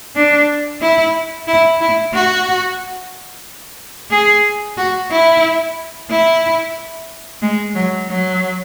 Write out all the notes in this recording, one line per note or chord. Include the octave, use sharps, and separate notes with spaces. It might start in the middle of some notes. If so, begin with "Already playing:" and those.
D4
E4
E4
E4
F#4
G#4
F#4
E4
E4
G#3
F#3
F#3